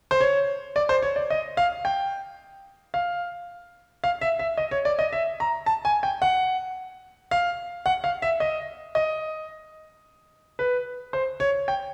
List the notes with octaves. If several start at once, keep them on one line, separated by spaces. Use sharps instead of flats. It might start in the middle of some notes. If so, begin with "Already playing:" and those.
C5
C#5
D5
C5
C#5
D5
D#5
F5
G5
F5
F5
E5
E5
D#5
C#5
D5
D#5
E5
A#5
A5
G#5
G5
F#5
F5
F#5
F5
E5
D#5
D#5
B4
C5
C#5
G5